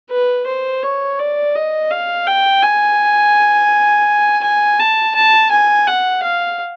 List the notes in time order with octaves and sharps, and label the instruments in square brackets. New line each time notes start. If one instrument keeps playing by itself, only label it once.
[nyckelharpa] B4
C5
C#5
D5
D#5
F5
G5
G#5
G#5
A5
A5
G#5
F#5
F5